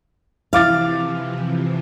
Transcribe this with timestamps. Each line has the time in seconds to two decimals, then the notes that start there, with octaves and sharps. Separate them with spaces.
0.53 C3 E3 F3 E4 F5 D6 A6